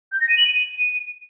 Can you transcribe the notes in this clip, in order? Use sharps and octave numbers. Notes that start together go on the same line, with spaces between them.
G6
A#6
D#7
F#7
D#7